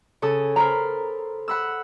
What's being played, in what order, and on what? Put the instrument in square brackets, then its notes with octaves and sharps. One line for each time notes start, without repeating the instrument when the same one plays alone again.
[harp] C#3 A4 D#6
[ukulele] A#4 A#5 [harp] C5 B5
[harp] F#5 B5 E6